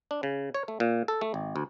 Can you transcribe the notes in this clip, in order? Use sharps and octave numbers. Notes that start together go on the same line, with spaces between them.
D4
C#3
C#5
A3
A#2
A4
A3
G#1
D2